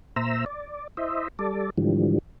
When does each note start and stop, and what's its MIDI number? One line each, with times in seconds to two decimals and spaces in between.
0.16 0.45 46
0.16 0.45 72
0.16 0.45 76
0.16 0.45 82
0.16 0.45 88
0.46 0.87 74
0.97 1.28 64
0.97 1.28 72
0.97 1.28 75
0.97 1.28 76
1.39 1.70 55
1.39 1.70 69
1.39 1.70 74
1.78 2.18 44
1.78 2.18 50
1.78 2.18 52
1.78 2.18 53
1.78 2.18 55